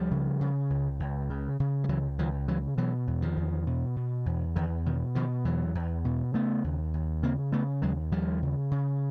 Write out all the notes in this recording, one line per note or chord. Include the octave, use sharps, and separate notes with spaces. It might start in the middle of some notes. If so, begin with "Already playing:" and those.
Already playing: C#2 F3 G3
C#3
C#3
C#2
C#2
C#3
C#3
G3
C#2 E3 F#3
C#2 D#3 F3
C#3 E3 F#3
B2 E3 F#3
E2
D#3 F3
E2
B2
B2
E2
E2 D#3
B2 D#3
B2 D#3 F3
E2 E3 F#3
E2
B2
C#3 A3 B3
D#2
D#2
C#3 A#3 C4
C#3 A3 B3
D#2 F#3 G#3
D#2 F3 G3
C#3
C#3